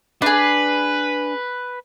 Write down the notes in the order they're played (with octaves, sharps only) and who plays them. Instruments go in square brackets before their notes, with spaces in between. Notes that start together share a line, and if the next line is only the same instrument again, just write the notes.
[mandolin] D4 G#4 [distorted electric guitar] B4